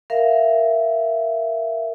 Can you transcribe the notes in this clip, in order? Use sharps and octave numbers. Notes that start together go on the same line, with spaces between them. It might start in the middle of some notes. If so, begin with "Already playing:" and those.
A#4 E5 F5